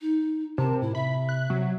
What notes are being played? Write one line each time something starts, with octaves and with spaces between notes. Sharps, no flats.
D#4
C3 A#4 A5
A2 E4
C3 E5 B5
F#6
C3 F#3